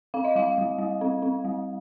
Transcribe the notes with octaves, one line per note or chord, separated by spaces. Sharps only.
C4 F5
D#5
G3 F5
G3
G3
C4
C4
G3